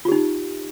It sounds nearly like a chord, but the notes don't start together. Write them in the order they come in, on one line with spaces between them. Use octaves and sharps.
F4 G4 D#4